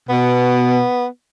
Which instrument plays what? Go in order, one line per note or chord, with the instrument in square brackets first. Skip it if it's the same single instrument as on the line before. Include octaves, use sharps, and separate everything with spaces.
[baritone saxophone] B2 [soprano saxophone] B3